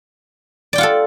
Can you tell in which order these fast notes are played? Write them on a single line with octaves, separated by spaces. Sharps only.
D5 G5 F4 F#5 A4